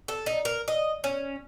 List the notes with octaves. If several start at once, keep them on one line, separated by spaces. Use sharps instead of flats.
A4
D#4
A#4
D#5
C#4